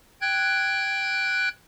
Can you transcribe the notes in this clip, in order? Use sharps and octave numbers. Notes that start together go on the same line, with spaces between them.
G5 F#6 G#6